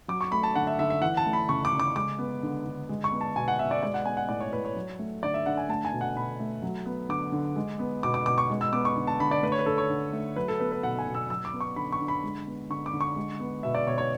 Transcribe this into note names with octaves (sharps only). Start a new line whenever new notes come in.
F#3 D6
C#6
A3 B5
A5
D3 F#5
E5
D3 E5
E5
E3 F#5
A5
A3
B5
C#3 C#6
D6
C#3
D6
G#3 D6
B3
D3
D3
G#3
C#6
B3
A5
B2 G#5
F#5
B2 E5
D5
G#3 D5
F#5
B3 G#5
F#5
A2 D5
C#5
A2 B4
C#5
F#3
A3
D3 D5
E5
D3 F#5
G#5
A3 A5
G#5
B2
F#5
B2 B5
A3
F#3
B3
D3 D6
D3
G#3
B3
B2 D6
D6
B2 D6
C#6
G#3
E6
B3 D6
C#6
D3
A5
D3 B5
D5
A3 B4
C#5
B4
D3 A4
C#5
D3
A3
F#3 B4
A4
B3 B4
B4
B2 F#5
G#5
B2
E6
F#3 E6
D6
B3
C#6
D3 B5
C#6
D3
B5
G#3
B3
D3 C#6
D6
D3
C#6
G#3
B3
B2 E5
D5
B2 C#5
C#5